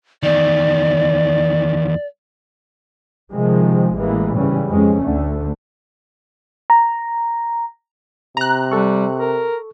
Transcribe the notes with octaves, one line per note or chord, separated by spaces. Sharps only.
E2 D#3 D5
C3 D#3 F3 G#3
A1 A2 E3 G#3 A#3
G#2 C#3 E3 G3 C#4
F2 G#3 C#4
D2 D3 A3
A#5
C3 A#5 F#6
G3 A4 C#6
A#4